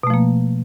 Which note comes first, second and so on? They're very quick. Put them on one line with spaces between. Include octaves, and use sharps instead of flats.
B2 A3 F3 A#3